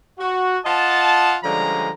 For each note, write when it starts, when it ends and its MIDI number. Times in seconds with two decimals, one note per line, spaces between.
0.19 0.58 66
0.66 1.36 65
0.66 1.36 75
0.66 1.36 78
0.66 1.36 81
1.44 1.90 50
1.44 1.90 53
1.44 1.90 55
1.44 1.90 56
1.44 1.90 61
1.44 1.90 82